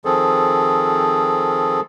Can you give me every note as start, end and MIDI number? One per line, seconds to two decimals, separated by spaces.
0.05 1.80 51
0.05 1.80 53
0.05 1.80 60
0.05 1.80 68
0.05 1.80 69